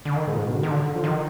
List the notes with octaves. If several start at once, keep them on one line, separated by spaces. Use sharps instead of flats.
D3
D#3
G#2
A#2
G#2
B2
D3
D#3
D3
F3
D#3